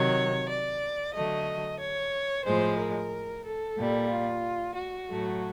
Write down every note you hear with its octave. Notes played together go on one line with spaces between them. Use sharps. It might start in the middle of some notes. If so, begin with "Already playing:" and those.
Already playing: C3 D#3 F#3 C#5
D5
D3 F#3 A3 D#5
C#5
A2 F3 G#3 C5
A#4
A4
A#2 G3
F4
F#4
A2 F#3 A3